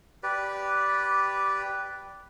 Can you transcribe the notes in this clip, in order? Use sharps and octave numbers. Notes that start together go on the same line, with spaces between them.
G4 B4 D5